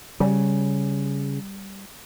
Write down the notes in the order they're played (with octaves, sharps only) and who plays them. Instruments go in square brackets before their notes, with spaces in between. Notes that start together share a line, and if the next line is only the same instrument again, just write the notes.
[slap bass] C#3 [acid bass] G3